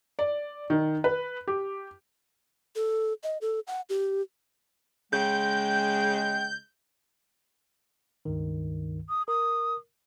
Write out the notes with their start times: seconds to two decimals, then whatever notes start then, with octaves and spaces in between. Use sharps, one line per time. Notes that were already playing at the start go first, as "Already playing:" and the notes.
0.19 D5
0.70 D#3
1.04 B4
1.48 G4
2.76 A4
3.24 D#5
3.41 A4
3.67 F#5
3.89 G4
5.13 C#3 G#3 G5 G6
8.25 C#2 G2 D#3
9.09 D#6
9.28 A#4 D#6